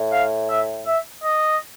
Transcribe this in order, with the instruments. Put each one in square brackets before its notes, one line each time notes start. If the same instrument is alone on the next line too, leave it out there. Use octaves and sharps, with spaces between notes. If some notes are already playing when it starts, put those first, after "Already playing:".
Already playing: [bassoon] A2
[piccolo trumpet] F5
E5
E5
D#5